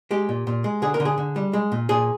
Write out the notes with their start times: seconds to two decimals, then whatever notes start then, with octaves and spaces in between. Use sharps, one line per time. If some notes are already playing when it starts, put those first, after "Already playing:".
0.11 G#3 G4
0.29 A#2
0.47 A#2
0.64 G#3
0.82 D3 G#4
0.94 A#4
1.00 D3
1.05 G#4
1.18 D3
1.36 G3
1.53 G#3
1.72 A#2
1.89 A#2 G#4